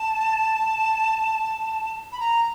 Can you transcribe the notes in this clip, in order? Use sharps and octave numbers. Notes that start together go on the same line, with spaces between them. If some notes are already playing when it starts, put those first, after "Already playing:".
Already playing: A5
B5
A#5